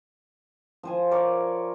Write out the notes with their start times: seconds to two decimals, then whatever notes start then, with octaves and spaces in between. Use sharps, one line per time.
0.83 F3 C5 G#5
1.11 A#4 C#5 D5